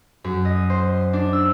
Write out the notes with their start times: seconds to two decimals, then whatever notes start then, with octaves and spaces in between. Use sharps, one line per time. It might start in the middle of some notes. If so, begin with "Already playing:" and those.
0.24 F#2
0.45 D#5
0.70 C5
1.13 D4
1.33 E6